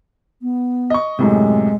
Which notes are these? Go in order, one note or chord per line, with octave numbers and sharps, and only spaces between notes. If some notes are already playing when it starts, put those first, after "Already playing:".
B3
D#5 C#6
F#2 A2 C3 G#3